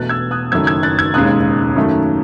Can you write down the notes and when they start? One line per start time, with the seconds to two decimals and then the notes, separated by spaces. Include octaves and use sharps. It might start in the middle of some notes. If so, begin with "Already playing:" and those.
Already playing: E1 E2 B2 A3 F#6 A6
0.09 E6 G#6
0.31 D#6 F#6
0.52 F#1 F#2 D#3 A3 E6 G#6
0.67 E6 G#6
0.83 F#6 A6
0.99 E6 G#6
1.14 E1 D#2 C#3 G#3 D#6 F#6
1.76 F#2 D#3 A3